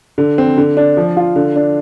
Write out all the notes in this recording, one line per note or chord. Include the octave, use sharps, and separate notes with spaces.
D3
C4
D3
D4
F3
F4
D3
D4